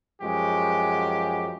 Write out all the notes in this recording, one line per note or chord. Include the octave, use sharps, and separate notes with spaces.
F#2 F3 G#3 F#4 G4